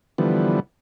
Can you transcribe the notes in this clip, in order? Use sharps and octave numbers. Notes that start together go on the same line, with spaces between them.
D3 E3 F3 G3 B3